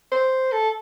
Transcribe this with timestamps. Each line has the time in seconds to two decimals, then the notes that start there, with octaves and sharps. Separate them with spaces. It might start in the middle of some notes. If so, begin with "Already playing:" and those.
0.12 C5
0.52 A4